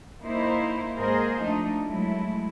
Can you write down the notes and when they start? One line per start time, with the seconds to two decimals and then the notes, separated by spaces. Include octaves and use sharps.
0.22 A#3 D#4 E4 C5
0.98 G#2 A#3 G#4 A#4 C5 D#5
1.42 F3 A3 D4 D#4
1.84 F#3 G#3 A3 E4